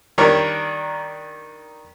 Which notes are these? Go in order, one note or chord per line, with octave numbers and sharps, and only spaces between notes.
D#3 G3 D4 A#4 C#5